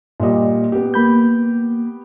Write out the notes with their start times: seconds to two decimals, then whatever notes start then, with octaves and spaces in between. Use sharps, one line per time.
0.20 A#2 G3 D#5
0.72 B3 G4
0.94 A#3 B5 G6